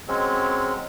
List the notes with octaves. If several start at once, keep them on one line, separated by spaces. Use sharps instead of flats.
F#3 G#3 C4 C#4